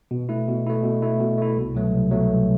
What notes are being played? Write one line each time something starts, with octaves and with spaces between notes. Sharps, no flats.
B2
A3 E4
B2
A3 E4
B2
A3 E4
B2
A3 E4
C2
B2 F#3 A3
C2
B2 F#3 A3
C2